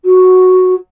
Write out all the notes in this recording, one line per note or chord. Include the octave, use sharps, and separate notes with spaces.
F#4